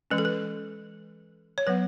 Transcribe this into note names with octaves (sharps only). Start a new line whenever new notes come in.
E3 G#3 C#4 B4
A4
B4
C#5
F#3 B3 B4